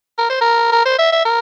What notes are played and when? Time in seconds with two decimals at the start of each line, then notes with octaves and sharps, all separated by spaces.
0.18 A#4
0.30 C5
0.41 A#4
0.72 A#4
0.85 C5
0.99 E5
1.12 E5
1.25 A#4